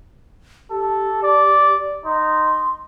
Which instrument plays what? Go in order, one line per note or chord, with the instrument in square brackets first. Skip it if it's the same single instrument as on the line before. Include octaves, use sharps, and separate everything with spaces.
[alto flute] G4 [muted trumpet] A4
[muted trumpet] D5
[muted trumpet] D#4 [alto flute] C6